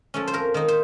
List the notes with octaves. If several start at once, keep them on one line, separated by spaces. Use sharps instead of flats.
F3 A3 C#4
C5
F2 A#4
D#3 A#3 D#4
C5